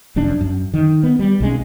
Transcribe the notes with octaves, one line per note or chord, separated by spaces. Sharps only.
F1 F#2 D4
F#2
D#3
B3
G3
B1 G#3 C#4